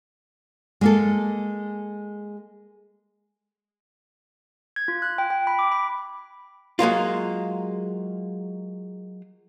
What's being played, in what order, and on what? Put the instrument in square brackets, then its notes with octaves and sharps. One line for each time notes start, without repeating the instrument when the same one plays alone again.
[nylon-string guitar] G#3 A#3 A4
[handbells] G#6
F4
F#6
G5
G5
B5
D6
B5
[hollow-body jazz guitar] F#3 G#3 A#3 F4